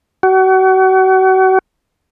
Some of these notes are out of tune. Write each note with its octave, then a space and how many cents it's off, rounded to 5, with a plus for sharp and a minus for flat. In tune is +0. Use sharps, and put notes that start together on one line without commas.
F#4 +35